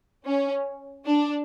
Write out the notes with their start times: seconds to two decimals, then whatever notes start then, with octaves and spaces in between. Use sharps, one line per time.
0.26 C#4
1.06 D4